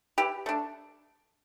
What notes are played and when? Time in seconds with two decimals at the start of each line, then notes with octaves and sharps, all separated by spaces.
0.18 E3 G4
0.46 A3 D4